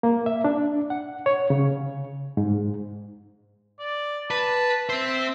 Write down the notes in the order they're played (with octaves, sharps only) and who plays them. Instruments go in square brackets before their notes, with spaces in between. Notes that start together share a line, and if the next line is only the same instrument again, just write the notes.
[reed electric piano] A#3
E5
D4
F#5
C#5
C#3
G#2
[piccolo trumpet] D5
[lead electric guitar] B4 [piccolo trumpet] A5
[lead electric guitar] C4 C5 [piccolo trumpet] E5